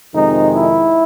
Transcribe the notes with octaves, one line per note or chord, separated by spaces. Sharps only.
F2 C3 D#3 G#3 C4 D#4
E4